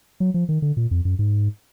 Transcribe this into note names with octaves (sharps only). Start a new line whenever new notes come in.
F#3
F3
D#3
D3
A#2
F2
F#2
G#2